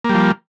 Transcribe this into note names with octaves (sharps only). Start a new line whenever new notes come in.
F3 G3 A#3